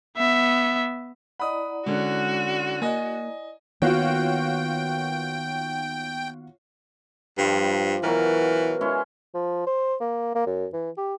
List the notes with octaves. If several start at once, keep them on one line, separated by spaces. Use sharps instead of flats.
B3 E5
E4 D5 D#5 F#5 A#5 B5 D#6
D3 G#3 C#4 F#4
A#3 D#5 G#5
D#3 A#3 B3 F4 F#4 C#5 G5
G2 F3 G3
B2 E3 F#3 A#4
G#3 C#4 E4
F3
C5
A#3
A#3
F#2
E3
G4